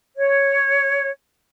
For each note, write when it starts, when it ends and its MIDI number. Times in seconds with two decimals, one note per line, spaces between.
0.16 1.10 73